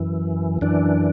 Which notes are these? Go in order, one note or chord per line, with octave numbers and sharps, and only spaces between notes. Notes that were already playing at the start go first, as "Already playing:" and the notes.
Already playing: F#2 E3
F#2 E3 D4